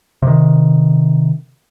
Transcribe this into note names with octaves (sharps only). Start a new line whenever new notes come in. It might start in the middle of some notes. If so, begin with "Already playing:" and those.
C3 D#3